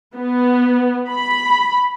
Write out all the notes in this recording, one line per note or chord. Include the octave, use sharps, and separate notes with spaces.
B3
B5